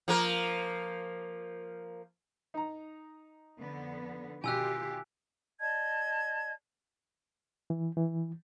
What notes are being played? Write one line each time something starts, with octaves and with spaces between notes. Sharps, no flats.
F3 A#3 A#4
D#4 A#5
F2 D3 B3
B2 D#3 F4 G4 G#5 E6 F#6
D5 D#5 A5 G#6
E3
E3